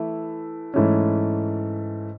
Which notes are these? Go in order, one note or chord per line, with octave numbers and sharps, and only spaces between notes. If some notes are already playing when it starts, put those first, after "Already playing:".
Already playing: E3 A3 E4
G#2 E3 A3 C#4